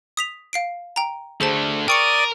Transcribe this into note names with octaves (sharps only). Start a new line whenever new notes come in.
D#6 B6 F7
F5 C7 D7
G5 A#5
D3 A3 G#4 C5 A5
A#4 D5 G5 C#6 D#6 C#7